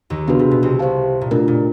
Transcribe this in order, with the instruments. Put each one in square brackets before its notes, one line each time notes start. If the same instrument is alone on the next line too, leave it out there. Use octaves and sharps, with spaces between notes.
[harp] D#2 D#3
[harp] C#3 [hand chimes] B3 D4 F#4 B4
[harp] C3
B2
C2 C3
[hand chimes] G4 C5 F5 A5
[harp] A#2
[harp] B2 [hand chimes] A3 D4 F4 A#4
[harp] A#2